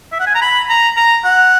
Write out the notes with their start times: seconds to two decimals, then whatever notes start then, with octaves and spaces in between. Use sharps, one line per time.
0.12 E5
0.20 F#5
0.27 G#5
0.35 A#5
0.42 B5
0.69 A#5
0.97 A#5
1.24 F#5